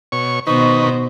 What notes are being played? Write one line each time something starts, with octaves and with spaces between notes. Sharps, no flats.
B2 C#5 C#6
B2 D#3 D#4 B4 C5 C#6